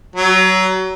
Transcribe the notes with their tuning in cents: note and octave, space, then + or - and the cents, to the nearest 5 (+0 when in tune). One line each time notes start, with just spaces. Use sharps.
F#3 +25